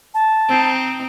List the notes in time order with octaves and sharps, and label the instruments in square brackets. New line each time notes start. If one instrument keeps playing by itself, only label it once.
[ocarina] A5
[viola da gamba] C4 D#4